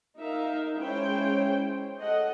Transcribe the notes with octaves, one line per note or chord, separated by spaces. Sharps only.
D#4 A#4 E5 F5
G#3 C#4 E4 C5 C#5 G5
A4 D#5 F#5